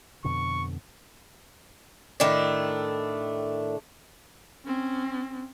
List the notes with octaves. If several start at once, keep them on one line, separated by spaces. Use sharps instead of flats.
F2 B2 D3 C#6
A2 D#3 A3 D4
C4 C#4